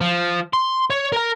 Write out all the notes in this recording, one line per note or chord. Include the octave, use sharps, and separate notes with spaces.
F3
C6
C#5
A#4 A#5